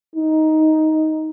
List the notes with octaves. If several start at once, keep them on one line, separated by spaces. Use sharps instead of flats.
D#4